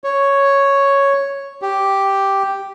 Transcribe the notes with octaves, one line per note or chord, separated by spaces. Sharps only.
C#5
G4